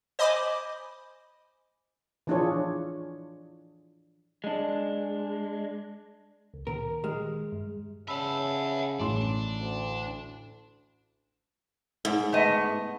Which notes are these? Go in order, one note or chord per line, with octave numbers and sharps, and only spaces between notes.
C5 D#5 G#5 B5 D6
E3 F3 D4 F4 G#4 C#5
G#3 D4
C#2
A#2 D#3 A#4
D#3 G#3 G4 F6
G2
C#3 E5 F#5 A5 B5 E6
A1 A2 D4 C6
D2
G#2
A3 B3 D#5